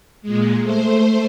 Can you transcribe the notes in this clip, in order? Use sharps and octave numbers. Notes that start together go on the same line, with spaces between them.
A#2 G#3
A3 C5